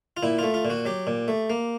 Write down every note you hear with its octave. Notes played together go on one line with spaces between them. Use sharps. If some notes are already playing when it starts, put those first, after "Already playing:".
F4
A#2 E4
A3 F4
F4
A#2
F#4
F#3 G4
A#2
A3
A#3